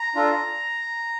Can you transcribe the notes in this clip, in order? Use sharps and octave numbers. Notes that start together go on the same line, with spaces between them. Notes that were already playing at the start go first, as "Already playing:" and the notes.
Already playing: A#5
D4 F4 A4